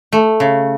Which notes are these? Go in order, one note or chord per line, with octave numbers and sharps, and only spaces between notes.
A3
C#3